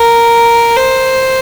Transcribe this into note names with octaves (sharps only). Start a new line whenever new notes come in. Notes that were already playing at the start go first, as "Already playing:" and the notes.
Already playing: A#4
C5